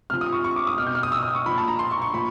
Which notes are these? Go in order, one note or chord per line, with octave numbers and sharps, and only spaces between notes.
C3 F3 F6
D#6
C#6
C#6
D6
D#6
B2 F6
G6
F6
D#6
E6
D#6
C#6
A#2 F3 B5
A5
A#5
C6
C#6
C#6
A#2 F3 B5